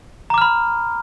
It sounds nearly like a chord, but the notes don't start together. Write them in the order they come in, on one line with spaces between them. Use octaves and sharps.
A#5 D6 F6 B5